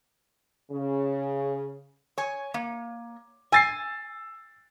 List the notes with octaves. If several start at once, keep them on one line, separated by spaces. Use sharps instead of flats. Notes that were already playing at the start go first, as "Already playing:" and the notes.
C#3
C#5 G#5
A#3
G#5 E6 A6 C7